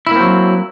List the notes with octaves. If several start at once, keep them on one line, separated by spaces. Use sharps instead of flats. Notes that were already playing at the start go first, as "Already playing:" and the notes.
F#3 A#3 C4 E4